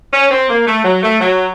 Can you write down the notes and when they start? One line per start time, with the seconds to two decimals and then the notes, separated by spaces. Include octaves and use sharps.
0.13 C#4
0.31 C4
0.49 A#3
0.67 A3
0.85 F#3
1.02 A3
1.20 F#3